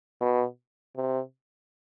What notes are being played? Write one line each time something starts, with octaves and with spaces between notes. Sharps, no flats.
B2
C3